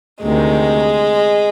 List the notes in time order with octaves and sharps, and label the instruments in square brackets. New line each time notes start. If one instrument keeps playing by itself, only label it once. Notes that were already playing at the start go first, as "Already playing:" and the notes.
[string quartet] D2 C3 D#3 G#3